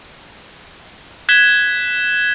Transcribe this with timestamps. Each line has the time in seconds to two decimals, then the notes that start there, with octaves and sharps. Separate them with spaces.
1.29 F#6 G#6 B6 E7 G7